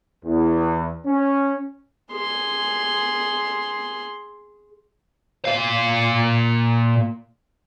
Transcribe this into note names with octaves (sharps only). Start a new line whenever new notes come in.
E2
C#4
G#4 C6
A#2 F5